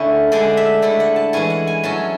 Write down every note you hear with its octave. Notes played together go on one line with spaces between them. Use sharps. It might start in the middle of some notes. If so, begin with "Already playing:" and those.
Already playing: D3 A3 C#4 E4
D3 G#3 D4 D5
E5
D3 A3 E4 D5
F#5
A5
E3 G#3 C#4 E4 G#5
F#5
G#5
F#3 C#4 E4 A5